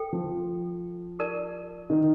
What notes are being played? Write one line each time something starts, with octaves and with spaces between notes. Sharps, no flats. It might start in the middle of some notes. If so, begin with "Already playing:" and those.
Already playing: A4 G5
F3
G4 A#4 D5 A5
D#3